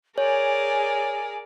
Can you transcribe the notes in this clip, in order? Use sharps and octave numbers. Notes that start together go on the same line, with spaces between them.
G#4 A#4 C#5 D5 G#5